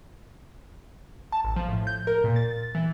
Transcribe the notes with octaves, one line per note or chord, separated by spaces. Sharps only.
A5
A1
F3
A2
G6
A#4
A#2
A6
E3